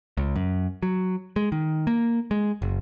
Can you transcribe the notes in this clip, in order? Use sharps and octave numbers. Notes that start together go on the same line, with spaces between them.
C#2
F#2
F#3
G#3
D#3
A#3
G#3
F#1